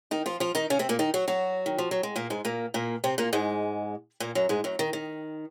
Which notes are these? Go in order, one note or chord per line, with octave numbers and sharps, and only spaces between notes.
D#3 D#4
F3 F4
F3 F4
D#3 D#4
C#3 C#4
C3 C4
A#2 A#3
D#3 D#4
F#3 F#4
F#3 F#4
D#3
F3
F#3
G#3
A#2 A#3
G#2 G#3
A#2 A#3
A#2 A#3
C3 C4
A#2 A#3
G#2 G#3
A#2 A#3
F#2 F#3
G#2 G#3
F#2 F#3
D#3
D#3